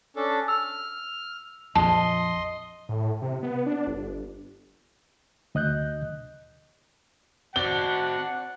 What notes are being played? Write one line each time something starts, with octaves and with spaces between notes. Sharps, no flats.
C#4 D4 A4
E6 F6
A#1 F2 D#5 A5 C6
A2
C3
B3
D4
G1
D2 D#5 F#6 G6
C4 D4 F#4 F#5 G7